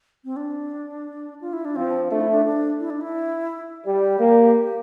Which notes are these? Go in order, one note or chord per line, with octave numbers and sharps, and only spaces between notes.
C4
D4
F4
E4
D4
F3 C4
A3 D4
E4
D4
D4
E4
D4
E4
G3 G4
A#3